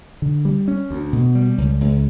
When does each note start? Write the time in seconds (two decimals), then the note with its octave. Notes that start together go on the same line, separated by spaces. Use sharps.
0.22 D3
0.45 G3
0.68 C#4
0.90 D2
1.13 B2
1.35 G3
1.58 C#2
1.81 C#2